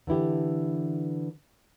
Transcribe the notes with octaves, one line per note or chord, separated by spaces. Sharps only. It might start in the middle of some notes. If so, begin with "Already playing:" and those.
D3 E3 E4 G4